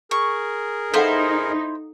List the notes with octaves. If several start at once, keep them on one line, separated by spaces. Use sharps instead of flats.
G#4 A#4 C#6
D#4 E4 A4 C5 F5 F#5